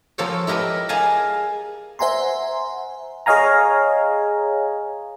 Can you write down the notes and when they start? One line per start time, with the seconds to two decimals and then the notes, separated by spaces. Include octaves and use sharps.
0.18 F3 A#3 F4 A4 C5 C#5
0.47 E4 G4 A#4 B4 D#5
0.89 G#4 A#4 D#5 F5 G#5 A5
1.99 C5 E5 F#5 G#5 A#5 C6
3.26 G#4 C#5 D#5 F5 G#5 A#5